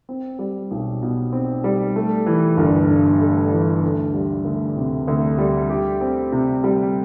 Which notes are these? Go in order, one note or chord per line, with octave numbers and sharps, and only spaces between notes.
C4
G3
B1
B2
C4
G3
A3
E3
G1
G2
A3
E3
D2
G3
D2
C3
D2
G3
G4
C4
C3
G3